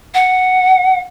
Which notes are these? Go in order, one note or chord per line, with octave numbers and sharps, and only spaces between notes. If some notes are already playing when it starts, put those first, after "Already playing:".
F#5